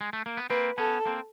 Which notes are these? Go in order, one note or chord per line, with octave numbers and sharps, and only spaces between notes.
G#3
A3
A#3
B3
A#3 C4 B4
B3 C#4 A4
A#3 C4